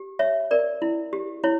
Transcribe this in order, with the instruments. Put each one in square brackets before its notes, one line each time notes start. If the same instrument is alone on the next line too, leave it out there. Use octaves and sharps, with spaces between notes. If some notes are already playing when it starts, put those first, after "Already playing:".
Already playing: [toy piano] G4
C#5 E5
A#4 D5
E4
G4
E4 C#5